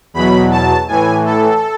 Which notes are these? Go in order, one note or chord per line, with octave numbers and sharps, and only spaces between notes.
E2 B2 F#3 B5
A5
A2 E3 G#5
A4